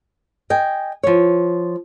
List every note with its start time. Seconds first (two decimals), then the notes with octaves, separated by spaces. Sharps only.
0.50 D#5 G5 G#5
1.03 F3 C#5